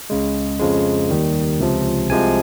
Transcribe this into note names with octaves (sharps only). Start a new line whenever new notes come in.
C#2 C#3 G#3
F2 C#3 F3 G#3
D#2 D#3 G3
C#2 C3 F3
C2 C3 F3 G#3 G#5